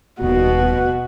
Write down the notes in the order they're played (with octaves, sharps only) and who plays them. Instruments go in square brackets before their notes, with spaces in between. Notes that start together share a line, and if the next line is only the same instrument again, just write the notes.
[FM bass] D#1 [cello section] B2 [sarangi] F#4